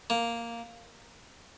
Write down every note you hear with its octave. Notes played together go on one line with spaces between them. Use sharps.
A#3